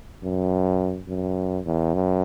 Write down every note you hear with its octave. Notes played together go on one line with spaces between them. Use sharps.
F#2
F#2
E2
F#2